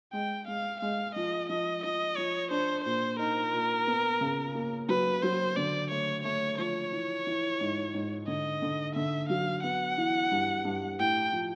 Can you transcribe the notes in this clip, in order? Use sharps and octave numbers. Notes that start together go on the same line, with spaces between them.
G#3 G5
G#3 F5
G#3 F5
F3 D#5
F3 D#5
F3 D#5
F3 C#5
D4 C5
A#2 C5
D#4 A#4
A#2
B3
C#3
A#3
F#3 B4
F#3 C5
D3 D5
A3 C#5
A3 C#5
F3 C#5
E3
E3
G#2
G#2
D3 D#5
D3
D3 E5
F#3 F5
B3 F#5
E3
G2
G2
A2 G5
F3